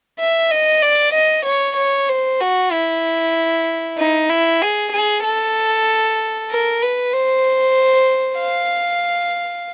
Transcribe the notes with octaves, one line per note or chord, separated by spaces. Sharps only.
E5
D#5
D5
D#5
C#5
C#5
C5
F#4
E4
D#4
E4
G#4
G#4
A4
A#4
B4
C5
F5